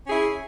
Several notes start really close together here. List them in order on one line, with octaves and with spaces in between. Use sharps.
C#4 G#4 E4